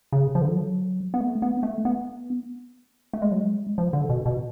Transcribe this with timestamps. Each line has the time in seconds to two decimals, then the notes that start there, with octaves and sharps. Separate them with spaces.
0.12 C#3
0.35 F3
0.41 D3
0.49 F3
0.56 F#3
1.14 B3
1.20 A3
1.42 B3
1.63 A3
1.85 B3
3.13 A3
3.22 G#3
3.32 F#3
3.41 G#3
3.78 F3
3.93 D3
4.09 B2
4.26 B2